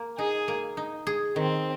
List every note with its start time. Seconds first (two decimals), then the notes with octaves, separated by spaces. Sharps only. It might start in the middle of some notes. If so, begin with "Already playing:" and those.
Already playing: A#3
0.18 D#4 G#4
0.48 A#3
0.77 D#4
1.07 G#4
1.36 D#3 C4